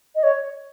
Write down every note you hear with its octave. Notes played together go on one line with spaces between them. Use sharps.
D#5
C#5